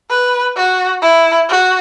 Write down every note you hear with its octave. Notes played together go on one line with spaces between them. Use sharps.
B4
F#4
E4
F#4